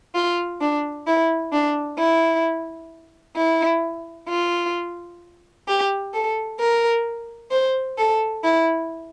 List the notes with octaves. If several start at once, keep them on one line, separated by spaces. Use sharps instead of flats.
F4
D4
E4
D4
E4
E4
F4
G4
A4
A#4
C5
A4
E4